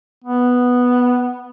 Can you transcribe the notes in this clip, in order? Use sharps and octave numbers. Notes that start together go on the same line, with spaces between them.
B3